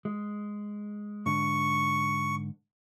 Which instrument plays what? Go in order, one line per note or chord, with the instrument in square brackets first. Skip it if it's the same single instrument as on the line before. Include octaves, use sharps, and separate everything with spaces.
[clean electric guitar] G#3
[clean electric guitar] G#2 D3 [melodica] C#6